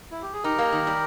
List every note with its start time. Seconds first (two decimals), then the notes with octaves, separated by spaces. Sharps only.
0.11 E4
0.22 G4
0.33 G#4
0.44 D#4 G4 A#4
0.59 A#3
0.72 D#3
0.87 G3